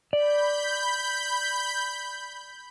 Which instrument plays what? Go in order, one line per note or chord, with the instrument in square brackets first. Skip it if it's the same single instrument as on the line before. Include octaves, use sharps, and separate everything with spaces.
[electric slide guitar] D5 [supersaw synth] B5 G6